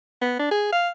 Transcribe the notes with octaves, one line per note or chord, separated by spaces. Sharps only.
B3
D4
G#4
F5